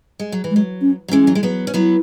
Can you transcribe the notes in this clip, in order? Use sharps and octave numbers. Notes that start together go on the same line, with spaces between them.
G#3
F#3
E3
G#3
F#3
C#4
F#3
E3 G#3 C#4
F#3
G#3
F#3 B3
C#4
F#3 B3 E4